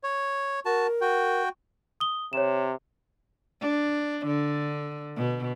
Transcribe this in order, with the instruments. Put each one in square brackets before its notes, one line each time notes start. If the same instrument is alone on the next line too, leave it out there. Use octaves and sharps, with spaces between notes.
[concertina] C#5
[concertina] F#4 A5 [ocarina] A#4
[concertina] F#4 G5
[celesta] D#6 G7
[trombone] C3 [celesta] C#5 E7
[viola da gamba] D4
D3
B2